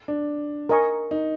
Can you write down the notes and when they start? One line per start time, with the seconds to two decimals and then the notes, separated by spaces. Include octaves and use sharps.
0.08 D4
0.69 A#4 D#5 G#5 C#6
1.11 D#4